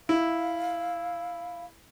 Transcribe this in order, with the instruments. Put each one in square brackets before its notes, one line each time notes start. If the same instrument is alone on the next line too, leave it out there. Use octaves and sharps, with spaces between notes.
[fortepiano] E4 [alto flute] F5